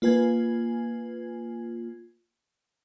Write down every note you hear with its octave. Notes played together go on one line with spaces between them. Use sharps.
A#3 F4 B4 G#5 G#6